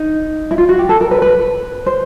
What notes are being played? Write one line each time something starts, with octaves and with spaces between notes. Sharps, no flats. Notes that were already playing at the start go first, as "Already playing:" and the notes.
Already playing: D#4
E4
F4
F#4
G4
A4
A#4
B4
B4
C5